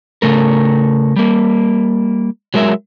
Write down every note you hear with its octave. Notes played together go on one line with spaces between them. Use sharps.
C#3 A3 A#4
G3 A#3
F#3 G#3 A#4 D5 E5